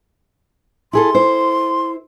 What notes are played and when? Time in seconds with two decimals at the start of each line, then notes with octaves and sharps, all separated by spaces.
0.93 E4 G#4 A4 C6
1.15 E4 C5